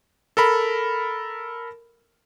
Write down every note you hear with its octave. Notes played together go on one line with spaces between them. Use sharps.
A4 A#4 B5